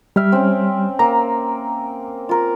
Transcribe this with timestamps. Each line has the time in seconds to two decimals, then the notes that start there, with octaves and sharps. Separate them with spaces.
0.16 G3 E5 G5 F6
0.32 C4 C#4
0.99 A#3 A#5
2.29 F4 A#4